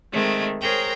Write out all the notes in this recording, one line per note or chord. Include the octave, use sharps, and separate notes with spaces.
D#3 G#3 A3 C4
G#4 A#4 C5 C#5 G5 A#5